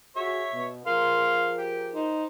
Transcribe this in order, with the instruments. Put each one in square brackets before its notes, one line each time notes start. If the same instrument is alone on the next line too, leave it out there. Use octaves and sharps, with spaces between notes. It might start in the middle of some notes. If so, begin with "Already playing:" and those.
[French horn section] F#4 G#4 [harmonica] C#5 E5
[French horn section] B2
[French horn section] F3 G#4 A#4 [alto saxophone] F5 [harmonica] C6
[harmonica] G4
[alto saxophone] D#4 [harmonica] C5